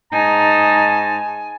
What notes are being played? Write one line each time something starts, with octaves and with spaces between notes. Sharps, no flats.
G#2 D#4 G#5 A5